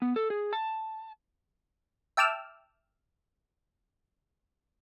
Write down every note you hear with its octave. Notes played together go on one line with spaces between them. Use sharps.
B3
A4
G#4
A5
E5 G5 A5 D6 E6 F6